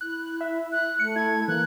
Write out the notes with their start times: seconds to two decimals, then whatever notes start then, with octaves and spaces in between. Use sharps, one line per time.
0.01 E4 F#6
0.41 E5
0.72 F#6
0.99 A3 C#7
1.16 E4 G#6
1.48 E3 A#3 F#6